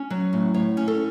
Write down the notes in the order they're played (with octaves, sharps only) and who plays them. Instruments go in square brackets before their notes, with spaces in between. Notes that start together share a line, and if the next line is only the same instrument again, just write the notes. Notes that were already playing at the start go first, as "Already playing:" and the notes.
Already playing: [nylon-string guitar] C#4
F#3
A2
A2 C#5
C#4
A4